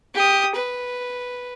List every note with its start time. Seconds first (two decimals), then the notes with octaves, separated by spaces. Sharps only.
0.14 G4 D#6
0.55 B4